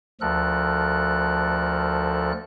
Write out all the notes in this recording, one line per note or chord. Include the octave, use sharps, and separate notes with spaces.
D2 F3 A4 A#4 F#6